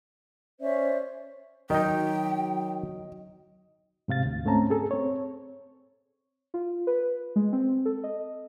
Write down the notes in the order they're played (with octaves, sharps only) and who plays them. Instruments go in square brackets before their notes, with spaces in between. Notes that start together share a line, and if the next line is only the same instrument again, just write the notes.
[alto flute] C#4 [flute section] C5 D5 E5
[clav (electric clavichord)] D#3 D#4 [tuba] F#3 [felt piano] D#5 [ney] G5
[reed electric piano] G#2 C3 F5 A6
D2
G#2 A3 C4 C#4 A5 A#5
G#4 A4
C4 C#5
[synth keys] F4
B4
G#3
C4
A4
D#5